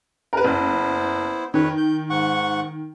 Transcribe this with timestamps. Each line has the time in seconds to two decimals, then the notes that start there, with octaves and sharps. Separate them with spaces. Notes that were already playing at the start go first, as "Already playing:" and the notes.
0.33 A#4 B4
0.44 F#1 B3 E4 C5
1.54 F2 D#3 B4 C#5
1.77 G6
2.10 G#2 F#5 C#6